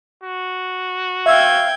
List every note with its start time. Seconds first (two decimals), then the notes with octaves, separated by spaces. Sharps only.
0.23 F#4
1.26 E5 F5 G5 E6 G#6